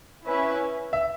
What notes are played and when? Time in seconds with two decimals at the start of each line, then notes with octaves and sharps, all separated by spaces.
0.26 C#4 E4 B4 E5
0.93 E5